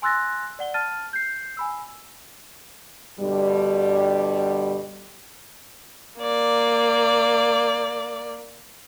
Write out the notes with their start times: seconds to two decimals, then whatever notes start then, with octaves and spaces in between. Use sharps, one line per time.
0.02 G#5 C6 E6 F#6 A6 A#6
0.59 D5 F#5 G7
0.74 A5 F6 A6 D#7
1.13 G6 C7
1.57 G#5 B5 E6
3.19 G2 B2 D3 G3
6.21 A#3 D5